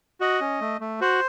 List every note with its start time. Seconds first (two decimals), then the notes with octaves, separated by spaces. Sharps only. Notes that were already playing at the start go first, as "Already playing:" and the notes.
0.21 F#4 D#5
0.41 C#4
0.61 A3
0.81 A3
1.01 F#4 C5